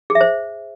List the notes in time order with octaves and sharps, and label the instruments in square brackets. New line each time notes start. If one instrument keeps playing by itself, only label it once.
[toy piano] G#4
E5
C5